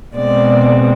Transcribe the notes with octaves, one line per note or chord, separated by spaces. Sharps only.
B2 G#3 C4 D5